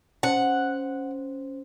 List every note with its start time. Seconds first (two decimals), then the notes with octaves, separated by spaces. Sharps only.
0.23 C#4 C5 F#5